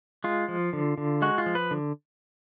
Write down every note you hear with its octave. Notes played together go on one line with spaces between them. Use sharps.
G#3 F4
F3
D3
D3
G#3 F#4
F4
F3
B4
D3